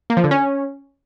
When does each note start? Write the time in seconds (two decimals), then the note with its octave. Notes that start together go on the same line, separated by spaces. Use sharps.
0.10 A#3
0.17 F3
0.24 D3
0.31 C#4